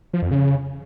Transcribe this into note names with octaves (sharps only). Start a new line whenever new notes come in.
F3
F2
C#3